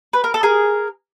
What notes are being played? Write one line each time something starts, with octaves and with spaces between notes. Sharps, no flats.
B4
A#4
A4
G#4 A#4